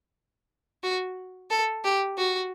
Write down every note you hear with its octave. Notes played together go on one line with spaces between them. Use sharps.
F#4
A4
G4
F#4